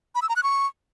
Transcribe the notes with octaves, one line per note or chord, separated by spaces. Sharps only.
B5
E6
A#5
F#6
C#6